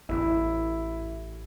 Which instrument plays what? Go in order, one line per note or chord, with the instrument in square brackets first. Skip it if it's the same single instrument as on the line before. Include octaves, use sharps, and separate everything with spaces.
[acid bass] A1 [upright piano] E4